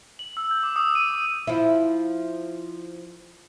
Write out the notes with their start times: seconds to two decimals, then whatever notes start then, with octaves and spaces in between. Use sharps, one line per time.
0.19 F#7
0.37 E6
0.51 G6
0.63 D6
0.76 D#6
0.95 D#7
1.11 D6
1.47 F3 E4